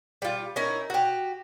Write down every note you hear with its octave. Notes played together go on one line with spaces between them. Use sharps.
G3 F4
C#4 D#4 E4 A#4
F#4 G4